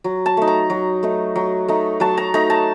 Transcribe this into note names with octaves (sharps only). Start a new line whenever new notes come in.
F#3
A5
A3 D#4
A#5
F#3
A3 D#4
F#3
A3 D#4
F#3 A5
A#5
A3 D#4 A#5
A5